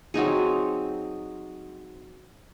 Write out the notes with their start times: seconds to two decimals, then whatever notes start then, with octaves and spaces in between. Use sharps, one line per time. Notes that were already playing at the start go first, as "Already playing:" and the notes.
0.14 F#3 C4 D#4 G#4